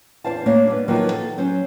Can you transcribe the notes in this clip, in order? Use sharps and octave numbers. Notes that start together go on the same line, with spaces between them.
E2 F3 D4 C5 F5 A5
A3 A#3 D4 C#5
G3 B3
D#3 F3 F#3 A#3 B3 D#4
A4
F#3 C#4 C5